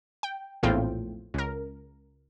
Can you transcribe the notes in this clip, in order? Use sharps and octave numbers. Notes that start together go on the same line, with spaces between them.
G5
A#1 E2 A2 C4 F4 G5
C#2 A#4